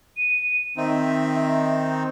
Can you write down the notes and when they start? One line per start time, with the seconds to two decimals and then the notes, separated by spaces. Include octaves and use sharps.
0.16 D#7
0.77 D#3 C4 D#4 E5